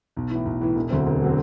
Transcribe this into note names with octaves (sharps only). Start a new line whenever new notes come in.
B1
A2 E3
B1
A2 E3
E1
D2 D3 F#3 C4
E1
D3 F#3 C4